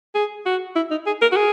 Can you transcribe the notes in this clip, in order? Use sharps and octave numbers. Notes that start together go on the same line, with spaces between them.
G#4
F#4
E4
D#4
G#4
A#4
F#4
G#4